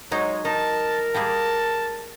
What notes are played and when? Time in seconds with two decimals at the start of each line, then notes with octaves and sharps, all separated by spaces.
0.11 F#3 G#3 D#4 C5 C#5
0.45 D#4 A#4 A5
1.14 G3 A#3 G#4 A5